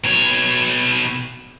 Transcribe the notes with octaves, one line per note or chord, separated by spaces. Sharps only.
B2 C#5